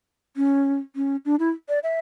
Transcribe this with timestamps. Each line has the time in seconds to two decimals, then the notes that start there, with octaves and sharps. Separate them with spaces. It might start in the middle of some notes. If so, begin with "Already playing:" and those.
0.36 C#4
0.96 C#4
1.25 D4
1.39 E4
1.69 D5
1.83 E5